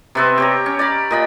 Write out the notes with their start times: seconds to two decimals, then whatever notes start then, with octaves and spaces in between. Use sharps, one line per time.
0.15 C3 B3 C4
0.38 G4 C#5 A#5
0.66 C#4
0.79 D5 A#5 B5
1.11 A#2 D#5 B5